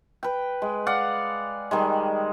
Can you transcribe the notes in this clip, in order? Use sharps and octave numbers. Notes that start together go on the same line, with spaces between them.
B4 G5
G#3
D5 F5 F#5
D#3 G3 G#3